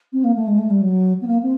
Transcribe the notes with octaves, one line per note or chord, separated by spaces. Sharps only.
C4
A#3
A3
G#3
A3
G3
F#3
B3
A#3
C4